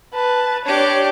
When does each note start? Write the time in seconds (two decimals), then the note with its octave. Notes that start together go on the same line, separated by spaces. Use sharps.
0.14 B4 A5
0.65 D4 G4 C#5 D5